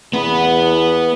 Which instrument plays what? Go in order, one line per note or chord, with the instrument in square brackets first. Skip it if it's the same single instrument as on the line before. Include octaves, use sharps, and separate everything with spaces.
[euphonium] E2 [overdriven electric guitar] B3 B4